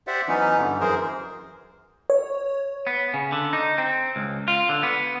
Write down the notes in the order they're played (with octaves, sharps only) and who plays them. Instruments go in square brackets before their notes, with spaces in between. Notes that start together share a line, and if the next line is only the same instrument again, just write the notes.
[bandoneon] G4 C5 D5 E5 F#5
E3 F#3 B3 C#4 D#4
G2 D3
F#2 E3 G#4 A#4 C5
[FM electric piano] C#5
[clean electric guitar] B3
C#3
D3
D#4
C4
C#2
F4
D3
B3